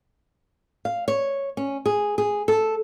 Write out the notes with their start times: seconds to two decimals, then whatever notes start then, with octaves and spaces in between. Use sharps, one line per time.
0.85 F5
1.08 C#5
1.57 C#4
1.86 G#4
2.18 G#4
2.48 A4